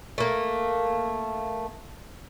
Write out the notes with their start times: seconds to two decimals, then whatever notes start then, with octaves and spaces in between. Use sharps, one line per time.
0.18 A3 A#3